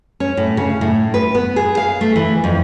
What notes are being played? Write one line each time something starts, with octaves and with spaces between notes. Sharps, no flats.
C#4
A2
C#3
A2
B4
B3
G#4
F5
A3
E3
F2